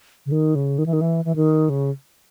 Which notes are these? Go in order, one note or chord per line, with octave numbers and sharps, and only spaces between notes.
C#3
D#3
C#3
D#3
E3
D#3
E3
E3
D#3
C#3